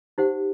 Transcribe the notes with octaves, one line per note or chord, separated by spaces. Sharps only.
D#4 G4 C5 F#5